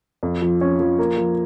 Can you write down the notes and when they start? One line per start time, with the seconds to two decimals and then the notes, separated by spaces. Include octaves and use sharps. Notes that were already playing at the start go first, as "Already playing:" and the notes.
0.23 F2
0.42 F3
0.61 C#4
0.80 F3
0.98 A#3
1.18 F3